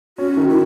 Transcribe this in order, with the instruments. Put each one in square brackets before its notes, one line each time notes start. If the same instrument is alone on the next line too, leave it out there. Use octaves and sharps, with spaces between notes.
[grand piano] C#4 [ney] F#4
[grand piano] D#3
[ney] E4